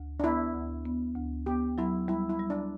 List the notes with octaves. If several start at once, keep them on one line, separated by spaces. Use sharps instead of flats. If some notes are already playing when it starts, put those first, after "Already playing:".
Already playing: D2
D4
B3 E4
D2
B3
D2
B3 G4
F#3 E4
G3 E4
E4
G3
D4